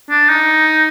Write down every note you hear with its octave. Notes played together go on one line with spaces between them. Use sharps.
D4
D#4